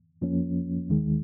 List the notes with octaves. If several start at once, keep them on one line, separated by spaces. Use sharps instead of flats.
F2 F3 A#3 C#4
D#2 D#3 G#3